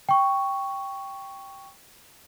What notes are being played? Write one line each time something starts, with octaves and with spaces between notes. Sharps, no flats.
G5 C#6